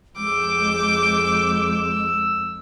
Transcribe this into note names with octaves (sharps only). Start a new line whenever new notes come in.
F2 G#3 D6 E6 G6